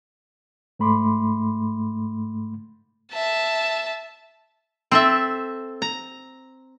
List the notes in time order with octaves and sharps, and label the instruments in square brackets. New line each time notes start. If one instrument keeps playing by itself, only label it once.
[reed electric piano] G#2 A3 B5 C6 D6
[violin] E5 A5
[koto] C4 A4 E5
A#5